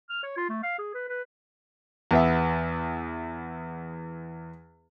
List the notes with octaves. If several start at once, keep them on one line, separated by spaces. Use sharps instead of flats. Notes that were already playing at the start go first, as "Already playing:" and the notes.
F6
C#5
F4
A3
F5
G#4
B4
B4
E2 B3 E5